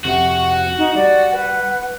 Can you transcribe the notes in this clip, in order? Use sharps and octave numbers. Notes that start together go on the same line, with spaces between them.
F2 C3 F#4 F#5
D#4 F#5
G3 D5
B4